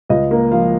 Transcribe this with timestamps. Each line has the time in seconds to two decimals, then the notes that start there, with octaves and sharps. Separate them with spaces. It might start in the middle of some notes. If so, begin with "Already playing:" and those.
0.10 C#2 D#5
0.31 A#3
0.52 F3 F5